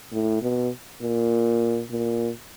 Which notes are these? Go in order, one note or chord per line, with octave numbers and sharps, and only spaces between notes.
A2
B2
A#2
A#2